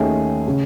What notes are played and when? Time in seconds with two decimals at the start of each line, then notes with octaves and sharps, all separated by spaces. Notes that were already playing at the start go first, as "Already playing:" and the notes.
Already playing: D#2 D#3 A3 C#4 G#4
0.48 C#3